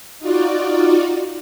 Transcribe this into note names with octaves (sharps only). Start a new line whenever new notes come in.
D#4 F4 F#4 D5